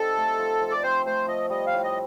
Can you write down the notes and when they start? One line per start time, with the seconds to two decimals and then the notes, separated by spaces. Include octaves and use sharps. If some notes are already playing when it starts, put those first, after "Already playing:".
Already playing: G3 C4 D#4 A4
0.17 A3
0.39 F3
0.61 F3
0.71 D5
0.83 C4 C5
1.06 A3 C5
1.28 F3 D#5
1.50 G3 D#5
1.67 F5
1.73 A2
1.84 D#5